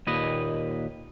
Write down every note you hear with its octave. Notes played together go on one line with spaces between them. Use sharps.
D#2 A#2 B4 D#5